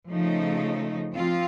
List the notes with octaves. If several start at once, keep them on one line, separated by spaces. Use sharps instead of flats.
C#3 F3 A3 D#4
F3 C4 F4